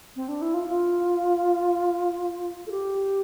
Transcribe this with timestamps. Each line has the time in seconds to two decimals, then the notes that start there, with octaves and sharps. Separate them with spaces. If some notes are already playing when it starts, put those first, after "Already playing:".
0.16 C4
0.28 D4
0.42 E4
0.54 F4
0.67 F4
2.67 A4
2.71 G4